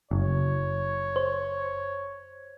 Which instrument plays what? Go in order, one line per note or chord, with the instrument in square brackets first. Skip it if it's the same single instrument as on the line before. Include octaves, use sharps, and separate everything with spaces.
[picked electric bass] F#1 [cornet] C#5
[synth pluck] C5